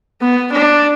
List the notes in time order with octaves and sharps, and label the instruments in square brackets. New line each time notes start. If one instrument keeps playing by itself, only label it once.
[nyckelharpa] B3
D4